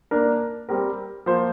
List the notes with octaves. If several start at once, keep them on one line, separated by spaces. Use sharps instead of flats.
A#3 D4 A#4
G3 C4 G4 A#4
F3 A#3 F4 C5